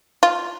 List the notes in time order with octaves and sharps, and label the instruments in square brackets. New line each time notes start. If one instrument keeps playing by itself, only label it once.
[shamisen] F4